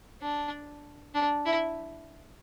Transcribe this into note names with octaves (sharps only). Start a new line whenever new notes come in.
D4
D4
E4